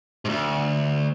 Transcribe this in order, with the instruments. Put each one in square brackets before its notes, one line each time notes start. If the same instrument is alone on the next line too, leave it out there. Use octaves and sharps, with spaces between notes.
[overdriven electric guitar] D2 G#2